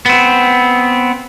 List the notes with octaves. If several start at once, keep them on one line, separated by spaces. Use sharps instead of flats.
B3 C4